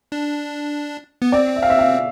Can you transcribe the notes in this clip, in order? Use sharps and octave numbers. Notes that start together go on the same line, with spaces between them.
D4
B3
C4 D5
E5
F5
E5
F5